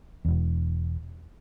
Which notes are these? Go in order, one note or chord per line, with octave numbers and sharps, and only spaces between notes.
E1 E2